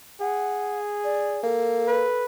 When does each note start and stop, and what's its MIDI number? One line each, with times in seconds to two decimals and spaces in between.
0.21 1.57 68
0.21 0.79 78
1.04 1.43 74
1.44 2.07 58
1.44 2.23 69
1.88 2.26 71